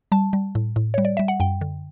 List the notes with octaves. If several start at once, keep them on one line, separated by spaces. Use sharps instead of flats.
G3 A5
G3
A2
A2
G3 C#5
D5
G3 E5
F#5
F#2 G5
D3